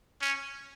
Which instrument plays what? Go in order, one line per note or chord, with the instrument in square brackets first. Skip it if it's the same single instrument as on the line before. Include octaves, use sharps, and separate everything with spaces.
[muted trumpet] C#4